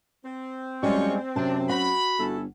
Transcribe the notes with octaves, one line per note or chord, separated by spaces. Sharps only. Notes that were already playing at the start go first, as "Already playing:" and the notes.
C4
F#2 G3 G#3 F4 A4 C#6
F#2 C3 D4 A5
F#4 B5
G1 C#4 E4 A4